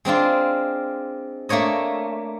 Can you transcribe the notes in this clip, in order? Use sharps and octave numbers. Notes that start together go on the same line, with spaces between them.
G#3 C4 D4 F4
A3 A#3 D4 C#5 D#5